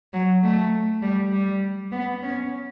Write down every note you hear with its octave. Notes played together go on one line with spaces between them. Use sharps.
F#3
A3
G3
G3
B3
C#4